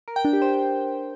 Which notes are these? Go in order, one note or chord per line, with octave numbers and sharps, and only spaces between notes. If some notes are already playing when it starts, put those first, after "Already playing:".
A#4
G5
D4
G4
C5